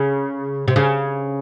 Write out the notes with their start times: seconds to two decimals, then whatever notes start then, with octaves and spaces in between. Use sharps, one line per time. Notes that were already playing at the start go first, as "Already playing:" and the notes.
Already playing: C#3
0.68 C3
0.76 C#3